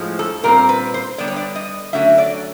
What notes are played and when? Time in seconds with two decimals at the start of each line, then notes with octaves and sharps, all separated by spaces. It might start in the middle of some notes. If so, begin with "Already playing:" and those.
Already playing: A2 F3 G#3
0.19 A4
0.43 A#2 G3 C4 A#4
0.69 B4
0.94 C5
1.18 D3 G3 B3 D5
1.28 C#5
1.36 D5
1.56 D#5
1.93 D3 F#3 A3 C#4 E5
2.18 D5